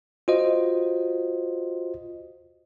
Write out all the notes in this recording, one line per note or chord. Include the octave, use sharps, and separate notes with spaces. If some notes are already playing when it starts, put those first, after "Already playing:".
F4 F#4 C5 D#5